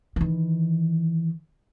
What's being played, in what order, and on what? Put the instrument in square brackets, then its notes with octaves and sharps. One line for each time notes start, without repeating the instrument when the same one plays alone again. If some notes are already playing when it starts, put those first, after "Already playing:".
[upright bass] D#3 E3